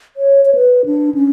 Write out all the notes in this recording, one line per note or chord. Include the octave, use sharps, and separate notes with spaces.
C#5
C#5
B4
D4
C#4